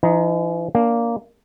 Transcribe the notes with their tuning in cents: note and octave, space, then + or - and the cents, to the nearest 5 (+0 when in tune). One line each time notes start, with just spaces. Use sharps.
E3 +45 D#4 +0
A#3 +0 D4 -25